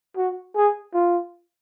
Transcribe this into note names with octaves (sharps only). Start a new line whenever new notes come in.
F#4
G#4
F4